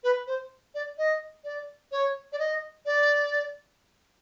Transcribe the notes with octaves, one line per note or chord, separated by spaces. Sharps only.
B4
C5
D5
D#5
D5
C#5
D5
D#5
D5